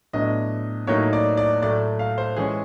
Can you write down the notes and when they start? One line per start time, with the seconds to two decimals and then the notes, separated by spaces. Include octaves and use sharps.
0.13 A2 F#3 B3 D4 D#5
0.87 A2 F#3 A#3 D#4 C#5
1.13 D5
1.37 D5
1.62 A2 F#3 A3 D5
1.99 F5
2.18 C5
2.36 E3 G#3 C#4 G#4